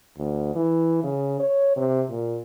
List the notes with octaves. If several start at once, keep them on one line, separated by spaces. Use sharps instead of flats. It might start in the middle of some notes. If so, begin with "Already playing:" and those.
D2
E3
C#3
C#5
C3
A#2